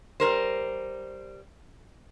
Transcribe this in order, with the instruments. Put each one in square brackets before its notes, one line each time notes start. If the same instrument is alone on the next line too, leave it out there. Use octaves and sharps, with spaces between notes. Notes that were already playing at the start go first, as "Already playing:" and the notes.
[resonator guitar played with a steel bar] G3 A#4 C5